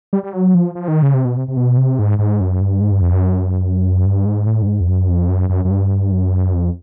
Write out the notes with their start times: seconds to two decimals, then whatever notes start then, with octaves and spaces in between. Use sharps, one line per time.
0.13 G3
0.23 G3
0.33 F#3
0.55 F3
0.75 F3
0.88 D#3
1.02 C#3
1.14 C3
1.25 B2
1.37 C3
1.48 C3
1.57 B2
1.77 C3
1.99 G#2
2.19 G#2
2.40 F#2
2.61 G2
2.81 G#2
2.91 G2
3.01 F2
3.12 F#2
4.05 G2
4.26 G#2
4.46 A2
4.62 G2
4.66 G#2
4.80 F2
4.88 F#2
5.09 F2
5.29 F#2
5.49 F#2
5.65 F#2
5.70 G2
6.12 F#2
6.53 F2